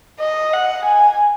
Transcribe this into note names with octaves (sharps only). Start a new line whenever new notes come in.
D#5
F#5
G#5